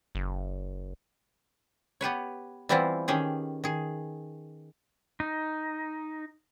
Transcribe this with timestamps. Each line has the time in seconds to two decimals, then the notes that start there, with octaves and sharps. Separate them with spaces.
0.15 F#1
2.01 B3 G4 B4 C#5
2.69 E3 G3 B3 C4 E4 F4
3.08 D#3 C#4 G4 G#4
3.64 D#3 G#4
5.20 D#4